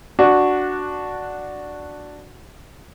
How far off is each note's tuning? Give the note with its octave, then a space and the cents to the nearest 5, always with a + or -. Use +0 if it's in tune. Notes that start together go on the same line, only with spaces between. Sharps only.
D4 +0 F#4 +0